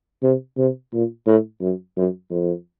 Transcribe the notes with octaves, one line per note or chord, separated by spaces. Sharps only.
C3
C3
A#2
A2
F#2
F#2
F2